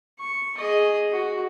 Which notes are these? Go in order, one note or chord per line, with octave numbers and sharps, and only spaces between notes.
C#6
G#4 D#5
F#4